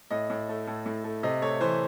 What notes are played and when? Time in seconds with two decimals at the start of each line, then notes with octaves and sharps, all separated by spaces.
0.11 A2 D#5
0.30 A2
0.49 A3
0.67 A2
0.86 A2
1.04 A3
1.23 C3 D#5
1.42 A3 C#5
1.60 E3 C5